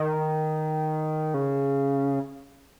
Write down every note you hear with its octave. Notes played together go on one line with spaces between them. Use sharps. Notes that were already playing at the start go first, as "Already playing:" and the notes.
Already playing: D#3
C#3